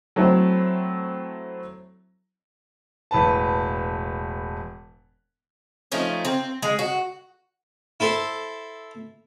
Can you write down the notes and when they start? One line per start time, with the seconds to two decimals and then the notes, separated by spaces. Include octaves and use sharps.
0.16 F#3 A3 C4 E4
3.11 E1 A2 B4 A5
5.92 F3 A3 C#4 D#4
6.25 C4
6.62 G#3
6.79 F#4
8.00 E4 A4 C5